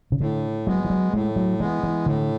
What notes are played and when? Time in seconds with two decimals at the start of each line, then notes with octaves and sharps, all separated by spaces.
0.12 C#3
0.21 A2 D3
0.67 F#3 G#3 B3
0.85 E3
0.90 F#3
1.14 A2 G#3
1.36 F#3
1.60 E3 G#3 B3
1.83 E3
2.06 A2 D3